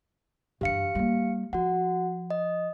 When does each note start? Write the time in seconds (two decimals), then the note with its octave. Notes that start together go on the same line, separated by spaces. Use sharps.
0.61 G2 E3 G4 F5 C#7
0.95 G3 A#3
1.53 F3 F#4 F#5
2.30 D#5